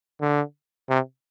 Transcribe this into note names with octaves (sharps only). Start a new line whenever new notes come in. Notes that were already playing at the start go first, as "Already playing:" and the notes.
D3
C3